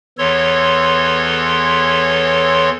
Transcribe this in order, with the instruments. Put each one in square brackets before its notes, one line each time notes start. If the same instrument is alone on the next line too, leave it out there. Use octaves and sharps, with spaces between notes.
[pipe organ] E2 E3 A4 C#5 C6